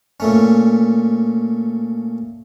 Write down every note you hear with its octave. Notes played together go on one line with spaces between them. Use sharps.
A#2 A3 C#4